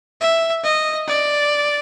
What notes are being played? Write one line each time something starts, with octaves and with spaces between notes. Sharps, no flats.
E5
D#5
D5